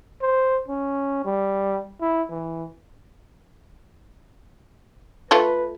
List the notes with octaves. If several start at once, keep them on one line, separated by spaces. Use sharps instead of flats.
C5
C#4
G3
E4
E3
A3 F4 A4 B4